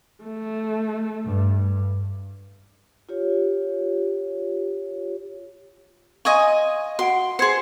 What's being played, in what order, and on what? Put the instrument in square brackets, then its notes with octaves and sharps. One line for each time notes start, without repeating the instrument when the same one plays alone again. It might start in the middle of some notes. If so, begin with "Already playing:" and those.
[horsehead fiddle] A3
[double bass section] G2
[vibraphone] F4 G4 C#5
[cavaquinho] D#5 G#5 C#6 [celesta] F5 C6
[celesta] F#4 F#5 D7 [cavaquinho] C6
[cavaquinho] G#4 C5 [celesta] C6 G#6 C#7